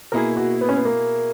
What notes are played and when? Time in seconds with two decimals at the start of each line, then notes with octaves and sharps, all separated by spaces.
0.12 B2 A#3 E4 G#4 A#4
0.37 F#4
0.61 B3
0.69 C#4
0.77 B3
0.85 A#3